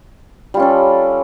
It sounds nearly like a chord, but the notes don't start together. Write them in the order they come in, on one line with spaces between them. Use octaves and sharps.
G3 F4 C#4 A4